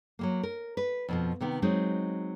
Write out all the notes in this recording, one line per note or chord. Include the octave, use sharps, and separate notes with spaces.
F#3 G#3 A#3
A#4
B4
F2 B2 F3
C3 D#3 B3
F#3 G#3 C4 D#4